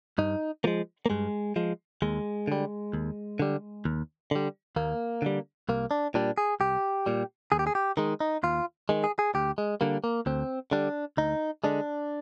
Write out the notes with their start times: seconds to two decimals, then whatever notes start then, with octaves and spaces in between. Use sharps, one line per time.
0.18 G2 D#4
0.64 F3 G#3 A#3
1.06 A#3
1.10 G2 G#3
1.56 F3 G#3
2.02 D#2 G#3
2.48 D3 G3
2.93 D#2
3.40 D3 G3
3.85 D#2
4.31 D3 G3
4.76 D#2 A#3
5.22 D3 G3
5.69 C2 A#3
5.91 D4
6.14 A#2 G3 D4
6.38 G#4
6.60 C2 G4
7.06 A#2 G3
7.52 D#2 G#4
7.59 G4
7.67 G#4
7.75 G4
7.97 D#3 G#3 D#4
8.20 D#4
8.43 D#2 F4
8.89 D#3 G#3
9.04 G#4
9.19 G#4
9.35 D2 G4
9.58 G#3
9.81 D3 G3 A#3
10.04 A#3
10.26 D2 C4
10.71 D3 G3 D4
11.17 D2 D#4
11.64 D3 G#3 D4